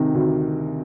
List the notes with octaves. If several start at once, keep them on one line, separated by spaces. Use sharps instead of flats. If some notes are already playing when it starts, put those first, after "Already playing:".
Already playing: C3 D#3
D2